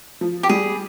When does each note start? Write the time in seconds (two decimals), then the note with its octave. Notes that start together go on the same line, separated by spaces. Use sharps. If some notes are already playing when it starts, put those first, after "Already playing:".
0.21 F3
0.43 G4
0.49 G3 G#4